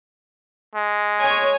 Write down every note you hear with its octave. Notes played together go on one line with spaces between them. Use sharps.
G#3
C#5 G#5